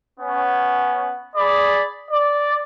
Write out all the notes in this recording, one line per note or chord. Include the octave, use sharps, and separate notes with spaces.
B3 C#4
G#4 D5 B5
D5